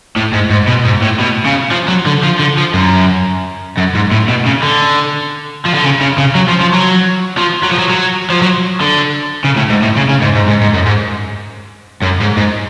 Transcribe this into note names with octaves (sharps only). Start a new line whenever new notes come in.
A2
G#2
G#2
B2
G#2
A2
B2
C#3
F3
F#3
D3
F3
D3
F3
F#2
F#2
G#2
A2
B2
C#3
D3
F3
D3
C#3
C#3
C#3
F#3
F3
F3
F#3
F3
F#3
F3
F#3
F#3
F3
F#3
D3
C#3
A2
G#2
A2
C#3
C#3
G#2
G#2
G#2
G#2
F#2
G#2
F#2
G#2
G#2